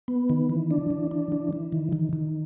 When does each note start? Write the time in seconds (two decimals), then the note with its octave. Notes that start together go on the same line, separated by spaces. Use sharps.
0.08 B3
0.30 D#3
0.49 E3
0.71 D4
0.90 E3
1.11 D4
1.32 E3
1.53 E3
1.72 D#3
1.93 D#3
2.13 D#3